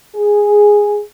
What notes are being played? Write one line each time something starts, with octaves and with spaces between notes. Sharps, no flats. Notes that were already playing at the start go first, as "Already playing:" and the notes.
G#4